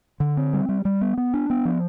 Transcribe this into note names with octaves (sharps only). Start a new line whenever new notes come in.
D3
C4
G3
G3
G3
B3
B3
D4
B3
F3